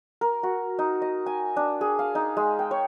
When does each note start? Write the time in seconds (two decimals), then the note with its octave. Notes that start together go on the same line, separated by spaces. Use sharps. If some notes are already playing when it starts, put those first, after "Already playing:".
0.21 A#4
0.43 F#4
0.79 D#4
1.02 D#5
1.26 G#5
1.57 D4
1.81 G#4
1.99 F5
2.15 D#4
2.37 G#3
2.59 G5
2.71 C#5